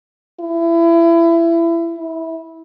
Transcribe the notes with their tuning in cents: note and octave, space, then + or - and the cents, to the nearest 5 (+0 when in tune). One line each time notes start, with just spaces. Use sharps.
E4 +25
E4 -20